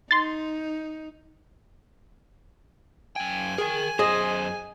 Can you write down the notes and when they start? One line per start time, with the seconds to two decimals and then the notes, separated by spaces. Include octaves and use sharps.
0.11 D#4 C6 A6
3.16 F#2 G5 G#5
3.58 G#4 A#4 G5
3.99 F#2 G#4 C5 D#5